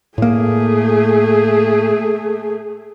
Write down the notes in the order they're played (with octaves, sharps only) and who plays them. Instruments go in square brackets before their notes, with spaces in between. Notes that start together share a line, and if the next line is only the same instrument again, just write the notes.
[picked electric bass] A2 A#3 [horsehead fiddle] A3 G#4